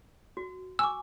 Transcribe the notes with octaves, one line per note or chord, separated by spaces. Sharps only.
F#4
G#5 C#6 D6 E6